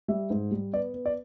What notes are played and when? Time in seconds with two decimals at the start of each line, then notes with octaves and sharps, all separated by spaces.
0.08 G3 E5
0.30 G#2
0.51 G3
0.73 B3 D5
0.94 B3
1.06 D5